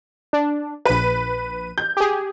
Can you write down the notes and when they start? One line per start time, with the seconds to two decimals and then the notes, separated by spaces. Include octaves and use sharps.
0.33 D4
0.85 A#1 B4 D#7
1.78 G6
1.97 G4 G#4